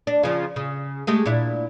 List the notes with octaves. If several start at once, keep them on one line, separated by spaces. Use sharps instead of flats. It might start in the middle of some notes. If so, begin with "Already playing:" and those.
D4
C#3 F3
C#3
G#3 A3 G4
A#2 D4 E4